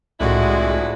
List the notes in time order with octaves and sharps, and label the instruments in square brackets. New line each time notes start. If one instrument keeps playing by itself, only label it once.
[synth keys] C2 A2 [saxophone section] F2 D4 E4 [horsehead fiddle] G#3 F#4